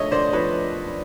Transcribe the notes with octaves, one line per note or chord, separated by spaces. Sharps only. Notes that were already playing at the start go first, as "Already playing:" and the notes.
Already playing: D3 F3 A3 C#5 D#5 E5
D3 C5 D5
F3 B4 C#5